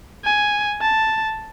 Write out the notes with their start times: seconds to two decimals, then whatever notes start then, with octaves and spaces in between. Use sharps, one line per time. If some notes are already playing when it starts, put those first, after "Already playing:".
0.25 G#5
0.82 A5